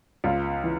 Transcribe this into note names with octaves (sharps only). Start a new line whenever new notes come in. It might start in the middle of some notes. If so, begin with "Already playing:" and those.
C#2 F4
E3